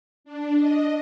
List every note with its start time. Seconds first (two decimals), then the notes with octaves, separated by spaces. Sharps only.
0.24 D4
0.56 D#5